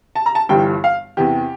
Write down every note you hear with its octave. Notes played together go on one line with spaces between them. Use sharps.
A5
A#5
A5
G1 G2 E3 G3 G5
F5
E2 C3 E3 G4